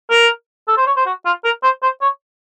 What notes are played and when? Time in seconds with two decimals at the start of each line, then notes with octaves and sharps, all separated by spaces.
0.10 A#4
0.68 A4
0.77 C5
0.87 C#5
0.97 C5
1.06 F#4
1.26 F4
1.44 A#4
1.63 C5
1.82 C5
2.01 C#5